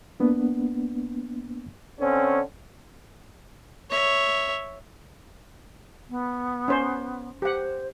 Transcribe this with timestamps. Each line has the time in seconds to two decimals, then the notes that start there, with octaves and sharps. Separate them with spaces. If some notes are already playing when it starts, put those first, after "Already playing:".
0.20 A#3 B3 D4
2.00 D3 C4 C#4
3.90 C#5 E5
6.09 B3
6.68 C#4 C5
7.42 G4 C5 F#5